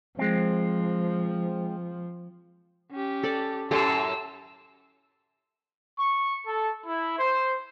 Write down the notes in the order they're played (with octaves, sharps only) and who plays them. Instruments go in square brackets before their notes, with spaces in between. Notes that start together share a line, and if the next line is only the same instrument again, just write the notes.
[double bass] F3 [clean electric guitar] G#3 C4
[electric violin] C#4 G4
[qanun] A4 D5
[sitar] F#2 A2 G4 [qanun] A4 [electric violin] C6 E6
[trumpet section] C#6
A4
E4
C5